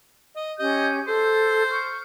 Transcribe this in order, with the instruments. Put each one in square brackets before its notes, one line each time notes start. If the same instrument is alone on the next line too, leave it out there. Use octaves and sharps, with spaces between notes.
[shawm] D#5
[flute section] C#4 G4 G6 [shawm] D#5
[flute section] A4 [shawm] C5
[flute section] C#6 F6 G6